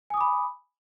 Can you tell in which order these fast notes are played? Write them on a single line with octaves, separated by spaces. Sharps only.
G#5 D#6 D6 B5